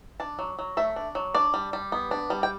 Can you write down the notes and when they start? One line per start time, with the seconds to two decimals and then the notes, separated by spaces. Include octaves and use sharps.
0.20 D4 A5
0.39 F#3
0.59 F#3
0.77 A3 E5
0.96 D4
1.15 F#3
1.34 D4 D5
1.54 G3
1.73 G3
1.92 B3
2.11 D4
2.30 G3
2.43 G5